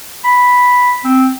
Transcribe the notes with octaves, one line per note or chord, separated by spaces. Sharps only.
B5
C4